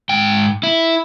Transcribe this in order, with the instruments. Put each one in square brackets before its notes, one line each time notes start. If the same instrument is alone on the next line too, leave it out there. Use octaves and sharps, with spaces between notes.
[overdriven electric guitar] G#2 G5
E4